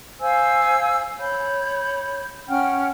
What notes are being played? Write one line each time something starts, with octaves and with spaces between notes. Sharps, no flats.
C5 F5 G#5 E6
C#5 B5 G6
C#4 F#5 G5 F6